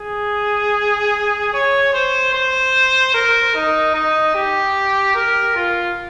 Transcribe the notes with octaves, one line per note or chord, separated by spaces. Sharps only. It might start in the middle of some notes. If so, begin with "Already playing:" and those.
Already playing: G#4
C#5
C5
C5
A#4
D#4
D#4
G4
A#4
F4